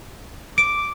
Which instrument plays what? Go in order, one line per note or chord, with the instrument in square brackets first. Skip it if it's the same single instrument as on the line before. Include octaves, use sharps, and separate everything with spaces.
[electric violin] D6 [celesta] D7